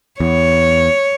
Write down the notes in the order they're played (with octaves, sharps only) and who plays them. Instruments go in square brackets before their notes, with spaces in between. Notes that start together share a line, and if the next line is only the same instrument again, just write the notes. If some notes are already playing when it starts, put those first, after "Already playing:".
[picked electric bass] E2 [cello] C#5